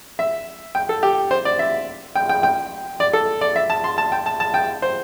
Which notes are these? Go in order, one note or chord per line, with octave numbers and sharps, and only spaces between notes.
E5
G5
A4
G4
C5
D5
E5
G5
G5
G5
D5
A4
D5
E5
A5
C6
A5
G5
A5
A5
G5
C5